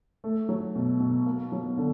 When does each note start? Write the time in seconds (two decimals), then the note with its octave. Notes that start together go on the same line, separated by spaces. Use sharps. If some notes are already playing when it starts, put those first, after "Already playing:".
0.24 A3
0.49 F#3
0.75 B2
1.00 B2
1.26 A#3
1.52 F#3
1.78 D3